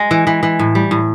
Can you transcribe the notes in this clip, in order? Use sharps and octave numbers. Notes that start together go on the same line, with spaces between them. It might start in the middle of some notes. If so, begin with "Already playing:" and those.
Already playing: G#3
E3
E3
E3
A2
G3
A2